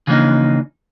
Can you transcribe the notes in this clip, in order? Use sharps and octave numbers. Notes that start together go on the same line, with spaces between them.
C#3 E3 F3 A#3 D4 D#4